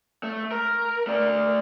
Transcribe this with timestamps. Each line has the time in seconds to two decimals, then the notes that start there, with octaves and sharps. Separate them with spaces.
0.23 A3
0.52 A#4
1.07 A3 D5